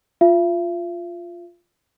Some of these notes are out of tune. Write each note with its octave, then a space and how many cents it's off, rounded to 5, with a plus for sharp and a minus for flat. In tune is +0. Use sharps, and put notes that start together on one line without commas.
F4 +0 E5 +45